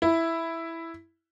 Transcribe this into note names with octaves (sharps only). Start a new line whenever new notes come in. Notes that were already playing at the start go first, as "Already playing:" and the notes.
E4